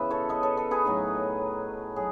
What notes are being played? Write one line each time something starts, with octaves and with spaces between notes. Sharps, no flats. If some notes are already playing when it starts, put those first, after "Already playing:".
Already playing: C#3 E3 B3 B4 E5
A4 C#5
B4 D#5
A4 C#5
A4 C#5
G#4 B4
A2 F#3 A3 D#4
F#3 G#4